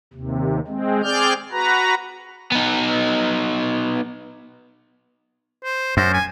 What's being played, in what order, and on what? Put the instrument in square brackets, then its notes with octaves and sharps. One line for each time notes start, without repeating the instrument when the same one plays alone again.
[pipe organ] D#2 C3
G#3 C4
C4 G#4 D5 F6 G6
F#4 B4 A#5
[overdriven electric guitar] B3 D#4
[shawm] C5
[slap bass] F#2 [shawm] C5
[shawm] G#5